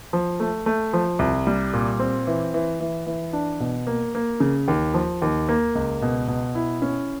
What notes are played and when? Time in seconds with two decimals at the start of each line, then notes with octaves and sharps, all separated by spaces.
0.13 F3
0.40 A3
0.66 A3
0.93 F3
1.19 C2
1.47 G3
1.73 A#2
1.99 C4
2.27 E3
2.54 E3
2.80 E3
3.06 E3
3.33 D4
3.60 B2
3.87 A#3
4.15 A#3
4.40 C#3
4.68 D#2
4.94 F3
5.22 D#2
5.49 A#3
5.75 C#2
6.02 B2
6.28 B2
6.55 E4
6.82 C#4